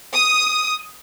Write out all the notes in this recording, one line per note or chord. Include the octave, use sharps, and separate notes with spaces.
D#6